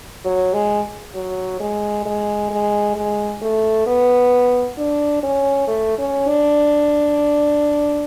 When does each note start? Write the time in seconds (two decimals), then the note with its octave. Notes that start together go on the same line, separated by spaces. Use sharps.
0.25 F#3
0.54 G#3
1.15 F#3
1.60 G#3
2.05 G#3
2.51 G#3
2.96 G#3
3.42 A3
3.87 B3
4.78 D4
5.23 C#4
5.68 A3
5.99 C#4
6.28 D4